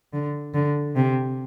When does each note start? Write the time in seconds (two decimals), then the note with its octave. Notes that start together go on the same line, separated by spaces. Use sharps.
0.13 D3
0.54 D3
0.96 C3